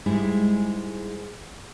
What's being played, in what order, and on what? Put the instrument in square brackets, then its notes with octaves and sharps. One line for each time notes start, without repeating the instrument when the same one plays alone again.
[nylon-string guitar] G#2 G3 G#3 D#4 E4